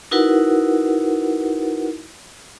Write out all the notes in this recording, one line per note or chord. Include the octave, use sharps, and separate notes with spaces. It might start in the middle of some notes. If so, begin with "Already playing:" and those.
D#4 E4 F#4 A#4 B4 F#5